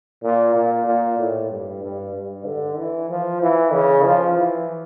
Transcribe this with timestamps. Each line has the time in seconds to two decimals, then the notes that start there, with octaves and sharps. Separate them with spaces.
0.23 A#2
0.55 A#2
0.87 A#2
1.19 A2
1.51 G2
1.83 G2
2.15 G2
2.46 D3
2.77 E3
3.10 F3
3.42 E3
3.73 C#3
4.05 F3
4.37 E3